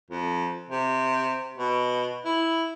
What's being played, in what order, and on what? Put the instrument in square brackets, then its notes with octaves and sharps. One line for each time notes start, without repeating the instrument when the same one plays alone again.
[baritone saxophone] F2
C3
B2
E4